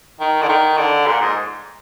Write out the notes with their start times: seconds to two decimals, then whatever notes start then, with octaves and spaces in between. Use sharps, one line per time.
0.20 D#3
0.42 D3
0.49 D#3
0.78 D3
1.07 A#2
1.21 G#2